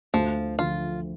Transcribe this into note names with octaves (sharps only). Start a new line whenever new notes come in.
D2 F3
D3 F3 A3 F4